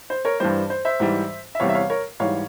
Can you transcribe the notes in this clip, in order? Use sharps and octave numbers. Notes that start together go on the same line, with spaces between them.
C5
A#4 C#5
G2 E3 G3 C5
C5
C5 E5
G#2 E3 G3
E5
E2 C3 E3 G3 C#5 F5
E5
C#5 F5
A#4 C#5
G#2 E3 G3 C#5 F5